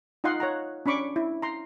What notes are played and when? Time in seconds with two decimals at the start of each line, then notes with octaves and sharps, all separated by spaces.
0.24 D#4 F4 D#5 F5 F#5 C6
0.40 C#5 F#5 A#5
0.86 C#4 D4 B5 C#6 D6
1.16 E4
1.42 A#5 C6